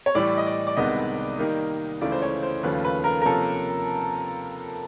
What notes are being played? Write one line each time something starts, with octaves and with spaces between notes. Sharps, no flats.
C#5
A2 E3 G3 D5
D#5
D5
D5
C2 C3 D#3 G#3 B3 D#5
D#3 G3 A#3 D#4
C#2 C#3 E3 A3 D5
C5
C#5
C5
D#2 C#3 F3 A3 C#4 B4
B4
A#4
A#4
C3 F3 A#3 C#4 A4